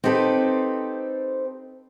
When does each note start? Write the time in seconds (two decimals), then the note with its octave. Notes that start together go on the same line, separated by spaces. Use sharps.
0.04 C4 D#4 G4 A4 B4